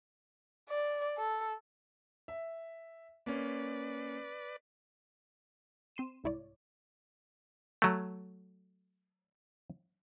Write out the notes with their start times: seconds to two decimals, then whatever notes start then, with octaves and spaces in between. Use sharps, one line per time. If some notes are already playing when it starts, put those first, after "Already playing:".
0.70 D5
1.18 A4
2.28 E5
3.26 A#3 C#4 B4 D5
5.96 C4 C6 D#7 E7
6.24 C2 G#2 E4 C#5 D5
7.82 F#3 A3